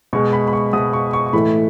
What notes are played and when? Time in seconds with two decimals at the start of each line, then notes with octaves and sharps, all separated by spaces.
0.13 B2 G#3 C#6
0.33 B5
0.48 B5
0.53 C#6
0.73 B2 G#3 D#6
0.93 C#6
1.13 C#6
1.26 C#6
1.33 A2 E3 A3 B5